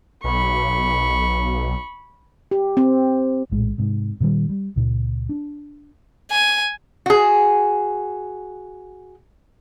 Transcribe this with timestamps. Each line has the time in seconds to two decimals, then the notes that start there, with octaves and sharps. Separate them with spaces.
0.24 B1 B5 C#6
2.51 G4
2.77 C4
3.51 A#1 A2 G#3
3.78 G#2 C3
4.20 A#2 D#3 F3 G3
4.49 G3
4.76 C#2 A#2
5.29 D4
6.31 G#5
7.06 F#4 G#4